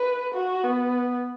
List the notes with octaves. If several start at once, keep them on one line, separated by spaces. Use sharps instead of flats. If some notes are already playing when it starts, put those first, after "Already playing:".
Already playing: B4
F#4
B3